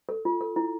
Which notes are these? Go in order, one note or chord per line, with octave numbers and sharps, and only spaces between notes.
A4
F4
A4
E4